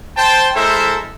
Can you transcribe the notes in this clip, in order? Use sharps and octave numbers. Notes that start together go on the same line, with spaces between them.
C5 G5 A5
G#3 E4 A4 A#4 C5 E5